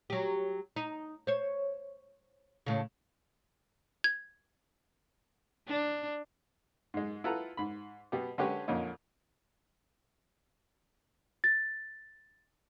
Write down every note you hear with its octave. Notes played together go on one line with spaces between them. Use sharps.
F#3 G4
D#4
C5 C#5
A2 C#3
G#6
D4
G#2 G#3
E4 F4 A4 B4 F#5 A#5
G#2 B5
B2 B3 G4
D3 G#3 C#4 G4 B4 C#5
F2 A#2 D3 C#4 D#4
A6